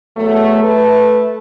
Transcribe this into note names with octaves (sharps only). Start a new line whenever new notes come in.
E2 F#3 A3
A3 A4 B4